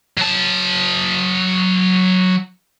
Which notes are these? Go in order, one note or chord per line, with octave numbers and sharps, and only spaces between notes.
F#3 A5